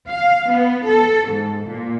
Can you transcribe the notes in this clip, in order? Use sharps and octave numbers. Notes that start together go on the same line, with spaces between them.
F5
B3
A4
G#2
A#2